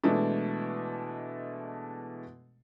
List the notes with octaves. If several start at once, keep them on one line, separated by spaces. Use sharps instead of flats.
B2 E3 G#3 A3 D4